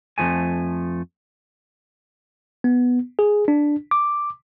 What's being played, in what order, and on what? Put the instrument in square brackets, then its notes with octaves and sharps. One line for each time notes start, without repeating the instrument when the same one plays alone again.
[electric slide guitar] F2 A#2 F3 A3 G#5
[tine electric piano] B3
G#4
D4
D6